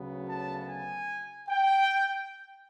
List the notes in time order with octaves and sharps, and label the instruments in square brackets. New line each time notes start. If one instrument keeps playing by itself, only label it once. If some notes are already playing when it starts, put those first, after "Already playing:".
Already playing: [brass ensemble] D2 C#3 F#3 B3
A5
G#5
G5